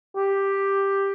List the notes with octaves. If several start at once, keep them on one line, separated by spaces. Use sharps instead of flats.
G4